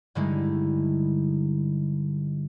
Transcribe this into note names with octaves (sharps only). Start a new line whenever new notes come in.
G2 D3 G3 G#3 D#4 E4